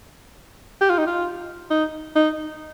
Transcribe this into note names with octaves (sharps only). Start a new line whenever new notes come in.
G4
F4
D#4
F4
D#4
D#4